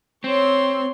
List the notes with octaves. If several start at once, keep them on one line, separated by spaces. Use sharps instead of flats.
C4 C#5 C6